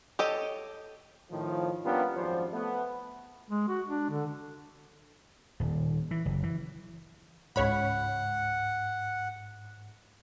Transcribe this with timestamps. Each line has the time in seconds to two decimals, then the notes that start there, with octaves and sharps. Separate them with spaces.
0.19 G4 A4 C#5 D#5
1.31 A2 D#3 F3
1.84 G3 A#3 B3 C#4 D4 F4
2.16 G#1 F#2 F3 G3 C5
2.53 A3 B3
3.50 G#3
3.68 F#4
3.88 D4
4.10 D3
5.60 D#1
6.11 E3
6.25 F#1
6.43 E3
7.56 C#2 G#2 C#5 F#5 B5